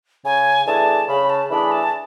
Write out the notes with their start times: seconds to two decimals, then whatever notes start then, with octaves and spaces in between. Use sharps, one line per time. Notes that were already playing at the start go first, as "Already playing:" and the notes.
0.25 C#3 G#5
0.67 E3 A3 D4 G#4 A5
1.08 C#3 B5
1.30 A5
1.50 E3 A3 D4 G#4 B5
1.72 A5